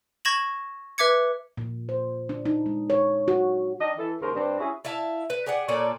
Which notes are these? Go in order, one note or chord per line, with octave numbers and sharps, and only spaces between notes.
C#6 G#6 A#6 E7 F#7
B4 E5 D6 G#6 C#7
A#2
C5
D4
D#4
G#3
C#5
F#4
D#3 D4 D#5
E3 A4
D#2 G#2 C#3 A#4 C5
G2 G3 C4 D4
C#4 E4 F#4 G#4
E4 E5 F5 A5
B4
G4 G#4 D5 F#5
A#2 C#4 A4 D5